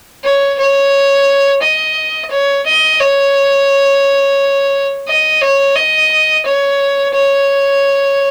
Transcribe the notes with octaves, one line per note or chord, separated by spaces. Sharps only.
C#5
C#5
D#5
C#5
D#5
C#5
D#5
C#5
D#5
C#5
C#5